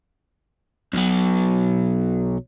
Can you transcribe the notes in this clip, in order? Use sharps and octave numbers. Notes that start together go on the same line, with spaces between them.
B1 F#3